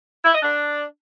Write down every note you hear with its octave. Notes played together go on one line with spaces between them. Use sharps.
E4
D#5
D4